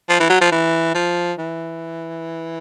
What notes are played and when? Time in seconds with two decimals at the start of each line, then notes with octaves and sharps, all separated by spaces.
0.09 F3
0.20 E3
0.30 F#3
0.41 F3
0.52 E3
0.94 F3
1.38 E3